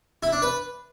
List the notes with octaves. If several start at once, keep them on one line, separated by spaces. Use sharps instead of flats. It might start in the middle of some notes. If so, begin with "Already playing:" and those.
E4
D4
B4